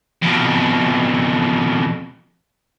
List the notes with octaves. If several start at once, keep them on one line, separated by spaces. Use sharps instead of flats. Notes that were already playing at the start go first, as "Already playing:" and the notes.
F2 B2